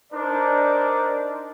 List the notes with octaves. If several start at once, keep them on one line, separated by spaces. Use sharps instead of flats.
D4 D#4 A#4 C5 D5